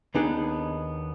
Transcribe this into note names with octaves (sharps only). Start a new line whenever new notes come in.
D#2 B3 D4 D#4 G#4